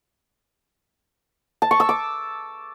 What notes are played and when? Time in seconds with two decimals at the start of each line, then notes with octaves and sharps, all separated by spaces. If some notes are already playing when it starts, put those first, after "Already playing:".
1.62 A5
1.71 C#6
1.80 E6
1.89 D6